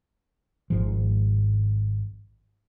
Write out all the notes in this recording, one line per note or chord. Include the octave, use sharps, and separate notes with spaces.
G#1 G#2 F3